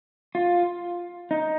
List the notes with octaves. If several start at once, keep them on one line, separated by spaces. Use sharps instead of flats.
F4
D#4